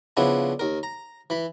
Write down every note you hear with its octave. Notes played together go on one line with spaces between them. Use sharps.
C#3 F3 B3 D4 E4
D#2 A#4
A#5
E3 B5